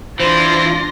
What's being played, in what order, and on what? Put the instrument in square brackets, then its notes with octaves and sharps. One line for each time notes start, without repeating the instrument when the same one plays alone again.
[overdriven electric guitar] E3 [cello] D4 F4 [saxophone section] C5 [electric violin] C6 A#6